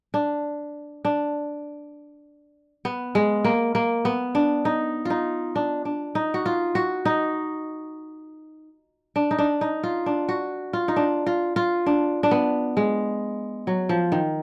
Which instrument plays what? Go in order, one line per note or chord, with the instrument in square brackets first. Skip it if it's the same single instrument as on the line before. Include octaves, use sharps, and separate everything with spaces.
[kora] D4
D4
B3
G#3
A#3
A#3
B3
D4
D#4
D#4 F4
D4
D4
D#4
F#4
F4
F#4
D#4
D4
D#4
D4
D#4
F4
D4
F#4
F4
D#4
D4
F4
F4
D4
D4
B3
G#3
F#3
F3
D#3